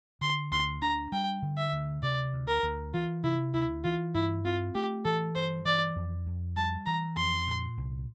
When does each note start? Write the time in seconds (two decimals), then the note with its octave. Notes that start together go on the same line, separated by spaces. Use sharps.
0.21 D3 C6
0.52 D2 C6
0.82 D4 A#5
1.12 G3 G5
1.42 D3
1.57 E5
1.72 D2
2.02 C3 D5
2.33 D2
2.48 A#4
2.63 D2
2.94 E3 F4
3.23 C3 E4
3.54 D2 E4
3.84 E3 F4
4.14 G2 E4
4.45 C4 F4
4.75 A3 G4
5.05 E3 A4
5.35 G2 C5
5.65 E3 D5
5.96 F2
6.26 F2
6.56 G3 A5
6.86 E3 A#5
7.17 F2 C6
7.47 A#2
7.77 C2